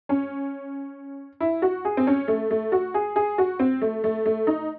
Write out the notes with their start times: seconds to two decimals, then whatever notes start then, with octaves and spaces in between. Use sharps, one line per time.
0.09 C#4
1.40 E4
1.62 F#4
1.85 G#4
1.97 C4
2.07 C#4
2.28 A3
2.51 A3
2.72 F#4
2.94 G#4
3.16 G#4
3.38 F#4
3.60 C4
3.82 A3
4.04 A3
4.26 A3
4.47 D#4